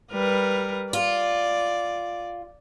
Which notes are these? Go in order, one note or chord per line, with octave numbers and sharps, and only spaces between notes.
G3 A#4 B4
F4 D5